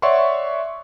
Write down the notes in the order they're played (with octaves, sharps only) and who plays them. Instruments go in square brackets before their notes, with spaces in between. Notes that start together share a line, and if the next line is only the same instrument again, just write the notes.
[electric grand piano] C#5 D5 E5 F#5 C6 C#6